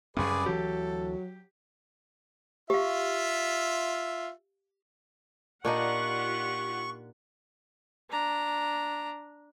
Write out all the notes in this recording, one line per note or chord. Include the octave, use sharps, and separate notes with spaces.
C2 F#2 C#3 C4 G#4 B4 D5 C#6
D2 E3 F#3 G4 A4
F4 G4 E5 F5
A#2 D4 D#4 F4 G4 F#5 C#6
D4 A#5